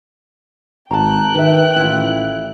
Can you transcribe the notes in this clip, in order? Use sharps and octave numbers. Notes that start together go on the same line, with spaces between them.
G#1 G5 A5 A#5 F#6
D#3 B4 E5
A1 E4 F4